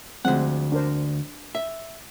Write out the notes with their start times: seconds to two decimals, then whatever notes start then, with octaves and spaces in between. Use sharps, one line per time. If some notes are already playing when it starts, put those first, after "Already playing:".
0.25 D2 F3 G#3 C4 F#5
0.72 D4 A#4 C5
1.55 E5